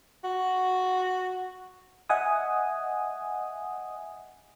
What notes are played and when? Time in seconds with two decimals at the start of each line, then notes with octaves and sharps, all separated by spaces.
0.24 F#4
2.09 D#5 E5 F#5 G#5 D#6